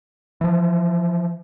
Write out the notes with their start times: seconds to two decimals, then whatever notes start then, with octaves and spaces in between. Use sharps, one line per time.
0.41 E3 F3